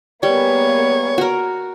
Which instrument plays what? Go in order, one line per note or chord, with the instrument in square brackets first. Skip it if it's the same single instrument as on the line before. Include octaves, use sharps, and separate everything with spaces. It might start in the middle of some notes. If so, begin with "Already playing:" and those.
[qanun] G3 [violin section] A#3 B3 G#4 [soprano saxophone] C#5
[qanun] F#4 A#4